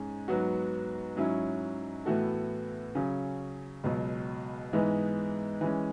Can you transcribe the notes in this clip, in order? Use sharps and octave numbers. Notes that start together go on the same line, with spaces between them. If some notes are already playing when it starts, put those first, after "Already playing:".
Already playing: G#2 G#3 C#4 G#4
G#2 F#3 B3 F#4
G#2 F#3 C#4 E4
A2 E3 B3 F#4 A4
C#3 F#3 C#4
C#2 B2 F#3
G#2 E3 G#3 B3
E3 G#3 C#4